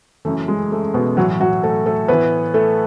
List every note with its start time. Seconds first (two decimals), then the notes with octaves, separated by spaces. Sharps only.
0.25 F#2 C#3 E3 A3
0.48 G#3
0.72 A3
0.94 B2 B3
1.17 A2 E3 F#3 F#4
1.40 F#3 F#4
1.63 A3 A4
1.86 A3 A4
2.08 A2 E3 B3 B4
2.54 A3 A4